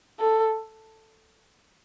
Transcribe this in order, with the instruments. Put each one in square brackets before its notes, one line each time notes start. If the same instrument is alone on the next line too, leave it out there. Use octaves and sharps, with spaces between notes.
[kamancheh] A4